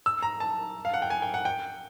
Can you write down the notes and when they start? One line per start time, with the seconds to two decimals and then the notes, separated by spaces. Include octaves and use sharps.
0.06 E6
0.22 A#5
0.40 A5
0.85 F5
0.94 F#5
1.02 G5
1.10 G#5
1.22 G5
1.34 F#5
1.45 G5